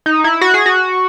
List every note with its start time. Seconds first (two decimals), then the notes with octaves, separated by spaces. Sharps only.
0.06 D#4
0.24 E4
0.41 F#4
0.54 G#4
0.66 F#4